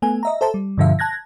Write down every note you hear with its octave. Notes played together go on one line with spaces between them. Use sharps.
A3 B3 G#5
D#5 E5 A#5
A4 C5 E5 A5
G3
G2 B2 D3 F3 E5 F5
A5 F#6 G#6 A#6